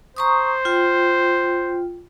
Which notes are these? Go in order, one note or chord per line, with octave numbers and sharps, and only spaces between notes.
C5 A#5 C#6 D#6
F4 G5